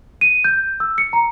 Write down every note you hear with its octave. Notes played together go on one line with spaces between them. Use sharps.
D#7
G6
E6
C#7
A#5